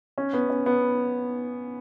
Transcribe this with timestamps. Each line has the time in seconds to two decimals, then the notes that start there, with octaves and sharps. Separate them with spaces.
0.18 C#4
0.33 B3
0.50 C#4
0.66 B3